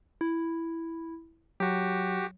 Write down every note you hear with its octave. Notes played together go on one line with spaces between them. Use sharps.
E4
F#3 F#4 G4